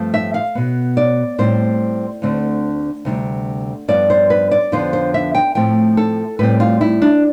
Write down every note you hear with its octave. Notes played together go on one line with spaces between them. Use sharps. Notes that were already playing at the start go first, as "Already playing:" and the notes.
Already playing: G2 F3 A3 C4
E5
F5
B2 B3
D5
A2 G3 C4 C5
D2 D3 A3 C4
D2 C3 G3
G2 F3 B3 D5
C5
B4
D5
F2 D3 F3 B3 C5
C5
E5
G5
A2 F3 A3 C4 G5
A4
A2 G3 C4 B4
F4
E4
D4